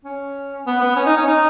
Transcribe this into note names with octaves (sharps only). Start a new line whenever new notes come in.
C#4
B3
B3
C#4
D#4
C#4
D#4